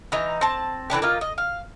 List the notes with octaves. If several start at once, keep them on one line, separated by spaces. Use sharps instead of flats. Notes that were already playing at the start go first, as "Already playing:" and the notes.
E3 D#4 A#5
C4 A5
D3 E3 D4 G4
A#3 D#4 F4
D#5
F5